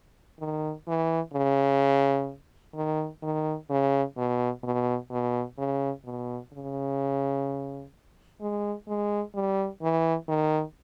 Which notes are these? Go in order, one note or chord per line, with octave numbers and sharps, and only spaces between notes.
D#3
E3
C#3
D#3
D#3
C#3
B2
B2
B2
C#3
B2
C#3
G#3
G#3
G3
E3
D#3